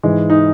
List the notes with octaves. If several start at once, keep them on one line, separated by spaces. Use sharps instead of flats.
G#2 E3 G#3
D#4